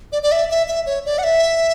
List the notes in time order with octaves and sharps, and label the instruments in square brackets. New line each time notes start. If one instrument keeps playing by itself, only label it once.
[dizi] D5
D5
E5
E5
E5
C#5
D5
F#5
E5